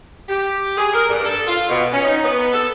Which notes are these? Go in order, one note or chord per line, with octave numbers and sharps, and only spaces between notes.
G4
G#4
A#4
G2
A4
F4
B2
C#4
D#4
B3
A4